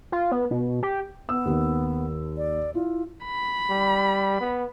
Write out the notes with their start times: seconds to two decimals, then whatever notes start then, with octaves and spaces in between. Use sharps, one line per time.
0.12 F4
0.32 B3
0.51 B2
0.83 G4
1.29 B3 E6
1.45 D#2 D#3
2.37 D5
2.74 E4 F4
3.25 B5
3.70 G3
4.41 B3